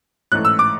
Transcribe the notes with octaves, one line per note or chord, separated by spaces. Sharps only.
A1 G#2 E3 A3 F#6
E6
D6